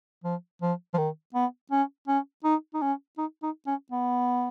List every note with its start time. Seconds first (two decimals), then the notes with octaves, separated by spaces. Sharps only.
0.24 F3
0.62 F3
0.94 F3
0.98 D#3
1.34 B3
1.71 C#4
2.08 C#4
2.44 D#4
2.74 D#4
2.82 C#4
3.18 D#4
3.43 D#4
3.67 C#4
3.91 B3